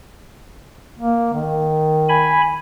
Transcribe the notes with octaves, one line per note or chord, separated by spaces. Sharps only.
A#3
D#3
G#5 B5